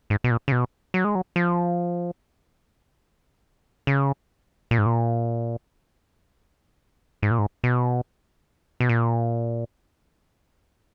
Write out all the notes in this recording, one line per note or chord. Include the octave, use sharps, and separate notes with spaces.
G#2
B2
A#2
C#3
B2
F#3
G#3
F#3
F3
C#3
A#2
G#2
A#2
G#2
A#2
G#2
B2
B2
A#2